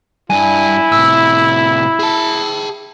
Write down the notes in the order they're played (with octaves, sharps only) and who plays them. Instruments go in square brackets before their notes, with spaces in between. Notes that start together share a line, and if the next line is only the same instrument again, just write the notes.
[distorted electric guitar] G2 D4 [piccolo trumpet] E4 [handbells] G#5
[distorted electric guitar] A2 C3 [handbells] E6
[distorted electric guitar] G#4 A5